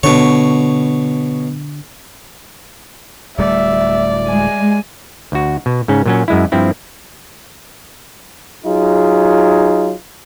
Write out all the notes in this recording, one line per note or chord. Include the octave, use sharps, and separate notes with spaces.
B2 D3 D4 C#5
D1 G3 A3 D5 E5
G#3 G#5
D2 F#4
B2
G#2 C#3 C#4
A#2 F#3 C#4
F#2 G#3 E4
G2 F3 C4 E4
F#3 D#4 F4 G#4